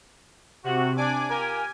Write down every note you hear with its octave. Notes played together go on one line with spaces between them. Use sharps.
C3 F#4
D4 G#5 D6
F4 G4 A#4 G#5